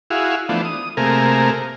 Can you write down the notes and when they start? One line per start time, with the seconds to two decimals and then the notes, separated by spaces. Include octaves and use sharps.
0.10 E4 F#4 G#4 F5
0.49 E3 F3 A3 B3 D4
0.65 D#6
0.97 C3 A3 A#3 G#4 A#4